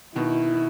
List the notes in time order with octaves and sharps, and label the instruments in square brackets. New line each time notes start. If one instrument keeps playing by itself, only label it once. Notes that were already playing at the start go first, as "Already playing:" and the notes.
[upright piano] B2 D#3 [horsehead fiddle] E4